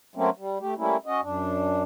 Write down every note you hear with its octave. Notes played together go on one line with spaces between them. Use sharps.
F#3 A3 A#3 C4 C#4
G3
A3 G4
G3 A3 A#3 C#4 E4
C#4 F#4 D#5
F#2 D4